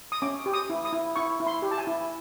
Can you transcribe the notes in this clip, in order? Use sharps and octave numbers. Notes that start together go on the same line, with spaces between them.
D#6
C#4 D6
G4
D#6
E4
D#6
E4
E4 C#6
E4
C6
G4
A5
G#5
E4